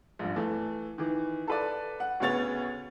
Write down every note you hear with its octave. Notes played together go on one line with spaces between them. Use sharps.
A#1 G2
E3 A3
D#3 E3
A4 B4 D5
F#5
D2 C#3 B3 C#5 A6 F7